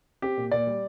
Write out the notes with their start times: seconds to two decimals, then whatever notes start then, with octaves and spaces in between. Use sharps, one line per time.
0.22 C4 G4
0.37 A#2
0.51 A#2 D5
0.67 G3